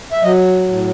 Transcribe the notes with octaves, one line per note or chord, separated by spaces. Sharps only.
E5
F#3 D#5
A2